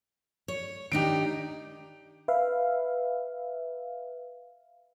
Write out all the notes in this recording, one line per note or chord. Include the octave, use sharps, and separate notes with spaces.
C#5
D#3 D4 D#4 G4 D7
B4 E5 F5